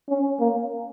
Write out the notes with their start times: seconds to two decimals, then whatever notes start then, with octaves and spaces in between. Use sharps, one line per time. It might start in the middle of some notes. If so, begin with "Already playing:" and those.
0.09 C#4
0.40 A#3